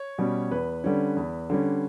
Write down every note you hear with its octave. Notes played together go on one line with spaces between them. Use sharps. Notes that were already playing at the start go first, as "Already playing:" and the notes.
Already playing: C#5
B2 G3 C#4
E2 B4
D3 G3 C#4
E2
D3 G3 C#4